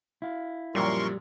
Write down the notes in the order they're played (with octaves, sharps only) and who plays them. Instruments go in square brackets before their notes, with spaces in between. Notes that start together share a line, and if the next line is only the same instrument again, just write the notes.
[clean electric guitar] E4 F5
[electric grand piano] F#2 A#2 F3 [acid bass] G3 [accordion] A#4 C6 C#6